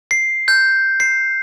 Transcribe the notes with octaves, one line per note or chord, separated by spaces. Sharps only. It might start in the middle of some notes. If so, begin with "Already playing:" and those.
C7
G6
C7